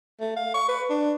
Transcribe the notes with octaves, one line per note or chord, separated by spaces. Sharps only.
A3
F5
C#6
B4
D4